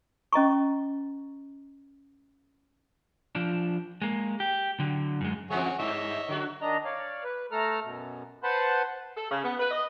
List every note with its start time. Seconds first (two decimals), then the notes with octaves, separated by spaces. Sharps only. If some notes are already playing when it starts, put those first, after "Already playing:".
0.32 C#4 D#5 A#5 C#6
3.35 F3 D4
4.02 G#3 A#3
4.40 G4
4.80 D3 F#3
5.21 F#2 G#3
5.50 E2 F3 G#3 F#4 G#4 C#5
5.79 G2 C#5 D#5 E5
6.28 D3 F#3 F#4
6.61 D#3 D4 D#5 A#5
6.85 C#5 D5 F5
7.24 B4
7.52 A3 A4 A#5 F6
7.83 F#2 B2
8.43 B4 C5 F#5 A5 B5 C6
9.17 A4
9.31 C#3
9.44 B3
9.59 B4
9.71 D#5